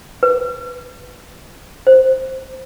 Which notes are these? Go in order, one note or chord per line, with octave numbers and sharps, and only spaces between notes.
B4
C5